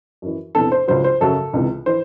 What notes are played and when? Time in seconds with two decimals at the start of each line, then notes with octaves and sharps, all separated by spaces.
0.22 F#2 E3
0.55 E2 C3 E3 A4
0.72 C5
0.88 C#2 C#3 F#3 C5
1.04 C5
1.21 F#2 C#3 F#3 A4
1.53 C#2 C3 E3
1.86 E3 C5